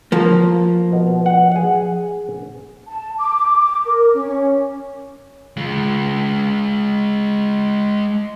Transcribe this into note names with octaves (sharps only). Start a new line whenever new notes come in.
F3 A#3
B2
F#5
G#4 F#5
A5
D6
A#4
C#4
G#3 F4